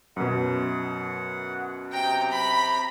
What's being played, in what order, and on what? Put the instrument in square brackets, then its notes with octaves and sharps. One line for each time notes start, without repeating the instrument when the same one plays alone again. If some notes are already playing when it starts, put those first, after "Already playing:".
[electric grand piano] F#2 B2 [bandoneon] F#5
[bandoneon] C3 A#5 G6 [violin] G5
[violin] B5